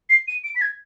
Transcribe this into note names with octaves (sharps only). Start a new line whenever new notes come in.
C7
D#7
D7
B6
G#6